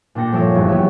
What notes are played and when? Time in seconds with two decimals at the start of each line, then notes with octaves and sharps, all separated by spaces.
0.15 A#2 D4 G5 A#6 C#7
0.32 G1 F3 C#5 E5 G#5 D7
0.55 G#1 E2 G2 C#3 G#6
0.68 F#3 B3 C#4 G4 E5